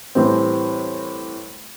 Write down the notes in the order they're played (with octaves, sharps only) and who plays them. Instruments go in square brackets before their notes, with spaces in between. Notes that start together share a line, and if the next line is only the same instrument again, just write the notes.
[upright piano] A2 E3 G3 C4